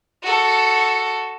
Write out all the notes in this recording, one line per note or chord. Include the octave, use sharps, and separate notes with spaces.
F#4 A4